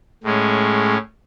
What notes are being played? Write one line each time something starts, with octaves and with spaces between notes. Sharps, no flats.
A2 G#3 C#4